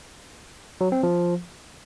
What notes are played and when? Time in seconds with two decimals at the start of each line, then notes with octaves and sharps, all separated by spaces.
0.81 F#3
0.92 C4
1.03 F3